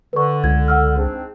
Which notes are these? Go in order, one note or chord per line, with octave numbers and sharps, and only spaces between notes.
D3 B4 C#6
C#2 G#6
F#5 E6 F6
G#2 C4 D4 G#4